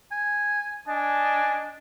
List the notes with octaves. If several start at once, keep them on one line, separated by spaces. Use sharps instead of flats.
G#5
D4 D#5 G#5